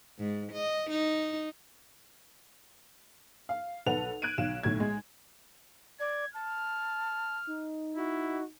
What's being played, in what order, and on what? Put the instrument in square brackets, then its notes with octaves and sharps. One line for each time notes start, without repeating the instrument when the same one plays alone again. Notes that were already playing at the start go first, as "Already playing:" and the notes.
[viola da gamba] G#2
D#5
D#4
[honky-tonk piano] F5
B1 A4 B4 F#5 F7
F#6 G#6 D7 D#7
B1 F5 E7
B1 A2 G#6
G#3
[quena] D5 [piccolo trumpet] G#6
[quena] A5 [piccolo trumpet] F6
[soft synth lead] D#4
[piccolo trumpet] E4 [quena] F#4